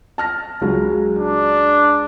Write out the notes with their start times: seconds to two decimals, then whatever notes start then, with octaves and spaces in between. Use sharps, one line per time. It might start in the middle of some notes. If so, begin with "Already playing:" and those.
0.18 A5 F6 A#6
0.61 C#2 F#3 G#3
1.19 D4